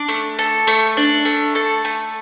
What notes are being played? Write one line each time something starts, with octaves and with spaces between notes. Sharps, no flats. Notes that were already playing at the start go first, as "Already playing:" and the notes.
Already playing: D4 D5
A3
A4
A3
D4
A3
A4
A3